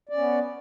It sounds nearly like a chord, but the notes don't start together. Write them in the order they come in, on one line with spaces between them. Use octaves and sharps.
D5 C#4 B3